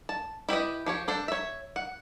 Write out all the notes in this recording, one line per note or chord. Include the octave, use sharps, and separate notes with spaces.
A5
E4 G4 B4 D#5
F3 G4 C#5
D4 A4 C5
C#5 E5
F#5